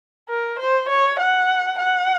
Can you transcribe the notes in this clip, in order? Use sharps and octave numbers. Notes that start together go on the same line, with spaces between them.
A#4
C5
C#5
F#5
F#5